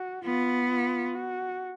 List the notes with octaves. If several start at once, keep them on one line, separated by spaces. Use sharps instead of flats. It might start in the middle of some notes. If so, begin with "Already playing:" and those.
Already playing: F#4
B3 F4
F4
F#4